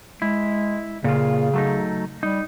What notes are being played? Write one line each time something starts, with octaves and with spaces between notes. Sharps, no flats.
G#3 E4
A#2 C#3 F4
F#3 A3 D#4
G3 D#4